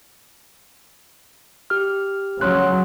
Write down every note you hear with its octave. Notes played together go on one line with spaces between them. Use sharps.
G4 F6
C#3 F#3 C#5 C6 F#6